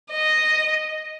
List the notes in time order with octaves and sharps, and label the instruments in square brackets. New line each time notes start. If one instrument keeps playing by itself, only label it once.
[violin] D#5